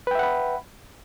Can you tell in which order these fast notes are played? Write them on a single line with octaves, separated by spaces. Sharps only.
B4 G5 E5 F#5 B5